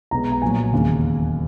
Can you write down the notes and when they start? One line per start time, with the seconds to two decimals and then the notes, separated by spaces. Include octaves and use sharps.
0.11 B1 B2 G#3 B3 A#5
0.32 A#5
0.42 A#1 A#2 F#3 G#5
0.72 E1 D#2 C#3 F#3